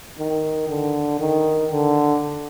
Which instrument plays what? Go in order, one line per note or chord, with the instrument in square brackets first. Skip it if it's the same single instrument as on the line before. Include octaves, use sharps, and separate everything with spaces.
[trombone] D#3
D3
D#3
D3